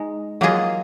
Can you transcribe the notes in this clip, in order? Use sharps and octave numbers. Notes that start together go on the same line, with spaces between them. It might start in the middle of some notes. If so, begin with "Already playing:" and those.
Already playing: G#3 D#4
F#3 A#3 F4 G#4 D#5